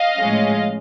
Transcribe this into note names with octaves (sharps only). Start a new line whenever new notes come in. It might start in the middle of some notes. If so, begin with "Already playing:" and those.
Already playing: D#5 F5
A2 F3 G#3 C#4